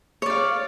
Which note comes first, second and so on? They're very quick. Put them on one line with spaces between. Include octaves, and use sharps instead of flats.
C#5 D5 F5